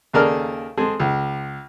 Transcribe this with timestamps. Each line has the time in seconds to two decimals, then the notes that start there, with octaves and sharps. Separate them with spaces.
0.13 D#2 C#3 A4 A#4 D5 F6
0.77 G#3 C4 G#4 A4
1.00 C#2